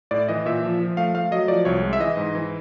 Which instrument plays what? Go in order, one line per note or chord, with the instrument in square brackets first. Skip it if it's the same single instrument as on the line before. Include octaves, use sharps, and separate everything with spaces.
[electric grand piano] A2 D5
E3 D#5
A#2 E5
F3
F3
A3 F5
A3 F5
F#3 D#5
F3 D5
C2 C#5
G#3
E5
E3 D#5
G#2
E3